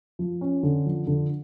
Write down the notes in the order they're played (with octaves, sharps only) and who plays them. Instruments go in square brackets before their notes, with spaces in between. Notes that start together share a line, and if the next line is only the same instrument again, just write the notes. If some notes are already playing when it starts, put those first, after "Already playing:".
[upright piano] F3
C#4
D3
F3
D3